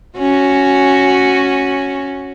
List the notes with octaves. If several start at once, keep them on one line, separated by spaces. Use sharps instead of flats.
C#4 F#4